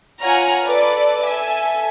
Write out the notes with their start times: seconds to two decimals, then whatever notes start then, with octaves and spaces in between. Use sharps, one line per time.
0.21 F4 C#5 F#5 G#5 A#5 F6
0.65 A4 B4 D5 D6
1.24 A4 E5 G#5